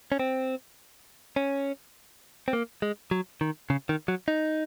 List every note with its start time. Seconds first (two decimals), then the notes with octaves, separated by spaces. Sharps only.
0.12 C#4
0.19 C4
1.36 C#4
2.48 C4
2.53 A#3
2.82 G#3
3.11 F#3
3.41 D#3
3.70 C#3
3.89 D#3
4.08 F#3
4.28 D#4